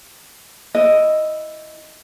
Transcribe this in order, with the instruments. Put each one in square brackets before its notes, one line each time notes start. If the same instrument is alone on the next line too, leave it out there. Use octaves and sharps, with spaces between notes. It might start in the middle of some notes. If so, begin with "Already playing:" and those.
[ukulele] E4 D#5